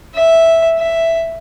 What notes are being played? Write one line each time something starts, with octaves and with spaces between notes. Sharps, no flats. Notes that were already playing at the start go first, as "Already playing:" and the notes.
E5
E5